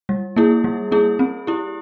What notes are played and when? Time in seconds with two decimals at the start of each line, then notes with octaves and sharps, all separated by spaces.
0.09 G3
0.36 A#3 E4 G#4
0.64 G3
0.92 A#3 E4 G#4
1.19 C4
1.47 E4 G4